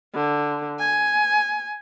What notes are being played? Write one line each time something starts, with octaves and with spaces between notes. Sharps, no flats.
D3
G#5